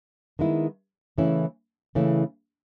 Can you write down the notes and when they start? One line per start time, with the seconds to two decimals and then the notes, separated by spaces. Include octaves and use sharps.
0.39 D#3 G#3 B3 E4
1.18 C#3 E3 A3 C#4 E4
1.95 C#3 E3 A3 C#4 E4